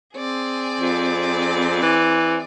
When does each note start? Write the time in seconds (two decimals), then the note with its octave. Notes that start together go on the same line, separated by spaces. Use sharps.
0.16 C4 G#4 D5
0.81 F2
1.82 E3